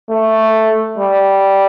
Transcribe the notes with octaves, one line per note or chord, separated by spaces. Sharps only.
A3
G3